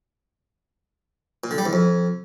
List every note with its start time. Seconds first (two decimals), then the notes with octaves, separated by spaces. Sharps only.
1.44 A#2
1.51 D3
1.58 G3
1.66 E2
1.73 F2